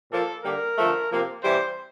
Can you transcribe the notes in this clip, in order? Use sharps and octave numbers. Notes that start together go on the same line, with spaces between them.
A#2 F3 A#3 A4
D3 G3 A#3 A#4
D3 F3 A3
C3 F3 A#3
C3 E3 G3 C5